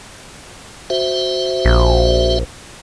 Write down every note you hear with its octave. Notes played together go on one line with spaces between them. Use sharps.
F#4 C5 E5
A#1